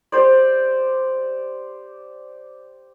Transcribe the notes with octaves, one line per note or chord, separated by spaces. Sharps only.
G4 C5 D5